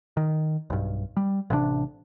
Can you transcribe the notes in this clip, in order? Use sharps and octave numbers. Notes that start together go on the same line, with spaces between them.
D#3
B1 G2
G3
A1 C3 F3 D4